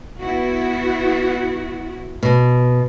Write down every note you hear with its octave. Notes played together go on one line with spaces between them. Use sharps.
B3 E4 F#4
B2